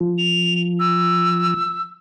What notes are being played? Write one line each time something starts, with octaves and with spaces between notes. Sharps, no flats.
F3
F7
E6